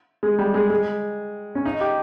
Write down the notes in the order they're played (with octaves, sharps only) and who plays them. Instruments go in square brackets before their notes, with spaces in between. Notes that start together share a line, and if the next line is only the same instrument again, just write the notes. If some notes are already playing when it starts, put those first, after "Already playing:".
[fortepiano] G#3
G3
G#3
G#3
C#4
D#4
G4